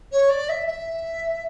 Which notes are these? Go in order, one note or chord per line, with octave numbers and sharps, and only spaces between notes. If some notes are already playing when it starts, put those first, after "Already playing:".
C#5
D5
E5
E5